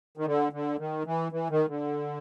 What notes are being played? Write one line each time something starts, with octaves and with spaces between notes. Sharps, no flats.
D#3
D3
D3
D#3
E3
E3
D#3
D3